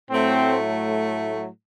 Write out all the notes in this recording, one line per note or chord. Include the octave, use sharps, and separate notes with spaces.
A2 F#3 A3 C4